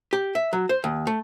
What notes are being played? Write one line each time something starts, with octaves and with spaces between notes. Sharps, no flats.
G4
E5
F#3
C5
D#2
A3